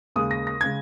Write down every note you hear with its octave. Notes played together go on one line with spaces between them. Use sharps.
D#2 C#3 G#3 D#6
A#6
A#6
C#3 G#3 G#6